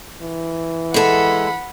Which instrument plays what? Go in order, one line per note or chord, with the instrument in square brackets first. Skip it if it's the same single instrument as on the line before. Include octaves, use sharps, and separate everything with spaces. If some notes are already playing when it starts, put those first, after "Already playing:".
[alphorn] E3
[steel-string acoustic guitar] G#3 A4 [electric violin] F#5 B5